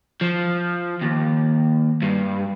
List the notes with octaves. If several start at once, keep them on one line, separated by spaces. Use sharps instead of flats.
F3
D#2
G2